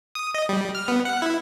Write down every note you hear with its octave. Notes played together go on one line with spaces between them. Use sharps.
D#6
D#5
G3
F6
B3
F#5
E4